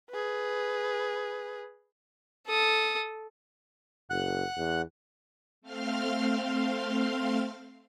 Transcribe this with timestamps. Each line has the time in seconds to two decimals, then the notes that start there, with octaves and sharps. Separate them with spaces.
0.10 G#4 B4
2.47 A4 D#6
4.10 F#1 F#5 F#6
4.57 E2
5.61 A3 C4 F5 C6 F6